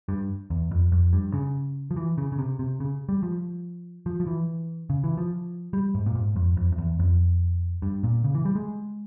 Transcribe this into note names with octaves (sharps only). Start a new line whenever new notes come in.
G2
E2
F2
F2
G2
C#3
F3
E3
C#3
C#3
C3
C3
C#3
G3
F3
F3
F3
E3
C#3
E3
F3
G3
G#2
A#2
G#2
F2
F2
F2
E2
F2
G2
A#2
C#3
E3
G3
G#3